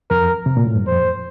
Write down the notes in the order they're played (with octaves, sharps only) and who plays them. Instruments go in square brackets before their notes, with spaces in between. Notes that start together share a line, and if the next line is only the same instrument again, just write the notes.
[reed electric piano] F2 [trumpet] A#4
[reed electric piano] C3
A#2
A2
G2
[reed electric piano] F2 [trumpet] C5